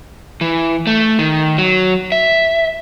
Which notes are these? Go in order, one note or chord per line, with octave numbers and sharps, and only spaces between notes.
E3
A3
D#3
F#3
E5